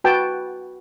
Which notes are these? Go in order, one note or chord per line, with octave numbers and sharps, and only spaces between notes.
F#4 B4 G5 A5